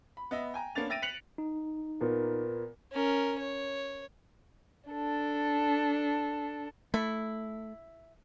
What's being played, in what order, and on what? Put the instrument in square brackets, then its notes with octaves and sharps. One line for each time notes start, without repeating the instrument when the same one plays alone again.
[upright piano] B5
B3 D#5 E5
G5 G#5 A#5
A#3 B3 C#4 D4 A6 F7
E5 G5 A6 A#6 D7 D#7
F#6 B6 C#7 F7 F#7
[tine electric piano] D#4
[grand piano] A#2 A#3 B3
[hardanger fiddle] C#4 A#4
C#5
[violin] D4 A4
[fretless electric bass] A3 [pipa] E4